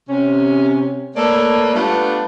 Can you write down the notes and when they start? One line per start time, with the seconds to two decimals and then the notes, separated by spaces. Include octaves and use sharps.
0.08 C3 C#4
1.15 A3 A#3 A4 B4 C#5 D5
1.74 G3 A3 B3 D4 F4 B4